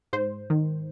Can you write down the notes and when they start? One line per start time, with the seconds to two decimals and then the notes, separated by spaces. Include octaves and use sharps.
0.13 G#2 C5
0.50 D#3